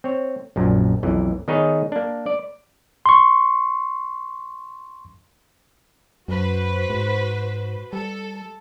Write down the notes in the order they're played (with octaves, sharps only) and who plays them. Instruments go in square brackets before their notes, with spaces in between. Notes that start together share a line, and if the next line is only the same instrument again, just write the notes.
[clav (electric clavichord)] C4 C#5
A#1 F#2 A#2
B1 F2 E3
D#3 B3 D#4 G#4 B4 C#5
A#3 D4
D5
[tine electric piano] C6 C#6
[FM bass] F#2 [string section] F#4 B4 C5
[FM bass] G#2
[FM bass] G3 [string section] A4